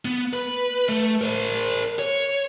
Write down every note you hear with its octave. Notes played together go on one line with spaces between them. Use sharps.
B3
B4
A3
A#4 C5
C#5